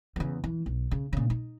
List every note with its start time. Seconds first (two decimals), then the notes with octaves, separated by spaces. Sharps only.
0.16 E2 C#3
0.44 E3
0.66 B1
0.91 C#3
1.13 A#2 C#3
1.30 D#4